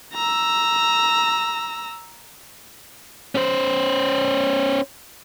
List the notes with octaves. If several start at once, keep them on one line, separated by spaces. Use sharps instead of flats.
A#5 E6
C#4 C5